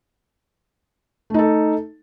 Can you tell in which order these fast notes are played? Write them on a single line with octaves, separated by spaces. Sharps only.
A3 D#4 A4